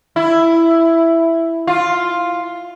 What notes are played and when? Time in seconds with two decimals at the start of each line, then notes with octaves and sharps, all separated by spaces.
0.16 E4
1.67 F4